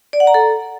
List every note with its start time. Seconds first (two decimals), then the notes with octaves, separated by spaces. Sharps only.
0.13 D5
0.20 F#5
0.27 A#5
0.34 A4